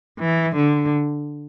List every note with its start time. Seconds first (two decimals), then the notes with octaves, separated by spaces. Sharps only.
0.20 E3
0.56 D3